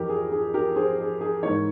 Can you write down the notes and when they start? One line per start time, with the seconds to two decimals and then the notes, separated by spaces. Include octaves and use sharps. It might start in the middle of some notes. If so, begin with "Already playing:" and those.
Already playing: F2 E3 G4 A#4
0.09 G#4
0.32 G#4
0.54 G4 A#4
0.76 G#4 C5
0.99 G#4
1.21 G#4
1.43 G#2 E3 A#4 C#5